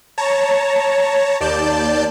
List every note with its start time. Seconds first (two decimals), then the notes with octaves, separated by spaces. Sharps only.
0.18 C#5 A5 A#5
1.40 D#2 D5 A5 G6